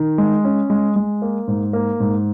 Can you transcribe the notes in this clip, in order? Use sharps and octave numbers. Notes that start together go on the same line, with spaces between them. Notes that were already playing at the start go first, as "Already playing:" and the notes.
Already playing: D#3
G#3
C#4
G#3
G#3
A#3
G#2
A#3
G#2